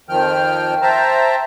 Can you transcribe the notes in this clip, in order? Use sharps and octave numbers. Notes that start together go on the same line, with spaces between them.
F2 D#3 F3 G5 F6
C5 E5 G5 A5 A#5